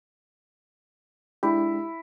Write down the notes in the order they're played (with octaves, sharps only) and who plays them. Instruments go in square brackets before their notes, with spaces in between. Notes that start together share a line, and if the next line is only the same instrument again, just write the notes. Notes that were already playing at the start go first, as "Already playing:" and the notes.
[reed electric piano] G#3 D4 G4 [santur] E4